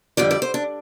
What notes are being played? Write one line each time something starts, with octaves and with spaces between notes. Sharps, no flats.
F2 D3 G3 D5
D5
C5
D4